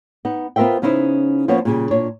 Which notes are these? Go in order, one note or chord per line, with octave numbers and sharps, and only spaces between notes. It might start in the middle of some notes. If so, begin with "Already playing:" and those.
B3 D#4
B3 F4 A#4 C5 E5 G5
C#3 B3 C#4 D#4 E4 C5
F3 A#3 B3 C#4 C#5
A#2 C#3 G3
A#2 D4 C#5